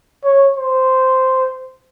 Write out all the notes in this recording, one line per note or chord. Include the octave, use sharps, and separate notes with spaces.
C#5
C5